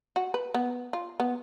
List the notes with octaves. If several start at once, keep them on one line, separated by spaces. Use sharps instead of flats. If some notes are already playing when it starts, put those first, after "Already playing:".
F#4
B4
B3
F4
B3